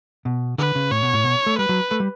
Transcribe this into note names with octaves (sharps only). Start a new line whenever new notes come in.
B2
D3 B4
C#3
A2 C#5
B2
A2
B2
A3
G3 B4
F#3
A3
G3